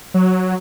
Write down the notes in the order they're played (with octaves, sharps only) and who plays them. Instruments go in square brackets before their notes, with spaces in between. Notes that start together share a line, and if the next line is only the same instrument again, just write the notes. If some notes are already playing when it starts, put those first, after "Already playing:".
[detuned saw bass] F#3